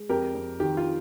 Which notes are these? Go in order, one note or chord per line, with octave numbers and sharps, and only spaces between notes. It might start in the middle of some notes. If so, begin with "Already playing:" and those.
Already playing: G#3
F2 G4 A#4
F2
D#3 G4
F4